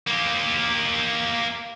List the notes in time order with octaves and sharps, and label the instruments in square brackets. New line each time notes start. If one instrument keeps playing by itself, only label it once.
[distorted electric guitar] A#3 G4